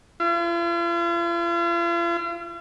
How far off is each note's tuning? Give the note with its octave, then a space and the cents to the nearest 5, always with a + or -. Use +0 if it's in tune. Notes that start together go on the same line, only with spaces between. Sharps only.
F4 -45